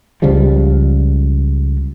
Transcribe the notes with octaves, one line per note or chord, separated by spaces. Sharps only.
C#2 C#3 F3 G3